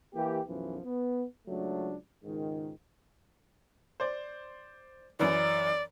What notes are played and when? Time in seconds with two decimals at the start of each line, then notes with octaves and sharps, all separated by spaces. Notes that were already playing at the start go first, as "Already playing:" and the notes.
0.15 E3 A#3 G4
0.47 B1 F#2 E3 F3
0.84 B3
1.48 C#2 F#3 A3 D4
2.24 C#2 G#2 D#3
4.00 C5 D5
5.19 F#2 E3 D5